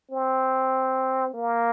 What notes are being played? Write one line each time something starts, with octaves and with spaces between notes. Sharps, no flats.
C4
A#3